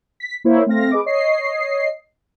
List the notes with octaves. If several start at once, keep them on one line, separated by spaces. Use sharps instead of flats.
B6
A#3 E4 C5 C#5
A3 C4 F5 A#6
G#4 B4 D#5 D6
C#5 D#5 C7